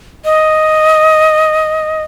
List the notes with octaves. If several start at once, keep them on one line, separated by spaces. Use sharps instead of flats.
D#5